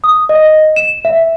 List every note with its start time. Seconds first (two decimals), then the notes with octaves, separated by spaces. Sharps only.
0.04 D#6
0.29 D#5
0.76 E7
1.05 E5